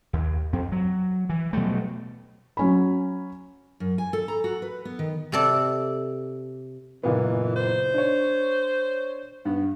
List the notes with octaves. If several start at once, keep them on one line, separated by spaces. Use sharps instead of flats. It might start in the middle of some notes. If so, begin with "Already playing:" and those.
D#2
F2 C4
F#3
E3
B2 F#3 G3 A3
F#3 C#4 B5
F#2
G#5
A4
A#5
F#4
B4
B3
D#3
C3 A4 D5
F#1 A#2 E3 B3
C5
D4 C#5
G2 B3